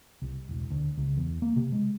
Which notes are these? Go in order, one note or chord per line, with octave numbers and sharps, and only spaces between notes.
C2
E1
D2
C#2
E2
A#3
C3
G#3